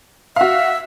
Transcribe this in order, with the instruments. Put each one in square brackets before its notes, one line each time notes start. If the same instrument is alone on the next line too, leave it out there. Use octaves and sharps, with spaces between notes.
[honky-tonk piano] F#4 F5 [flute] E5